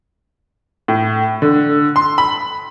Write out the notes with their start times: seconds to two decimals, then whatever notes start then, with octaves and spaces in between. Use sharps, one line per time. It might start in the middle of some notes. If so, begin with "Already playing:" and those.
0.88 A2
1.42 D3
1.96 C6
2.18 B5